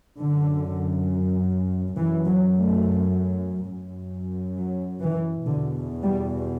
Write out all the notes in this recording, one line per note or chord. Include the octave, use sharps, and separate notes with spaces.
F#2 D3
F#2 E3
F#3
A3
F#2
F#3
E3
E2 B2 D3
G3